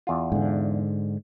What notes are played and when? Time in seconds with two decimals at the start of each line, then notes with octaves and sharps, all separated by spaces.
0.07 E2 F4
0.32 G#2 D3